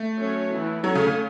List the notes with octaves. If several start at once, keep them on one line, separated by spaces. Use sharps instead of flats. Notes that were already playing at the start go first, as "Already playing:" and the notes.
Already playing: A3
F#3 C#4 A4 C#5
E3 B3 E4
F#3 A3 C#4 A4 C#5
C#3
C#3